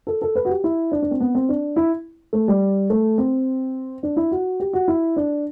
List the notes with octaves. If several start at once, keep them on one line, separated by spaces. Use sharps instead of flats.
A4
A4
B4
F#4
G4
E4
D4
D4
C4
B3
C4
D4
E4
A3
G3
A3
C4
D4
E4
F#4
G4
F#4
E4
D4